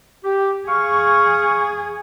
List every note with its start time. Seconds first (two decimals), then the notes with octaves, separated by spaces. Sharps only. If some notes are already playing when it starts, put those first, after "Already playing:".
0.24 G4
0.68 G#4 F5 C#6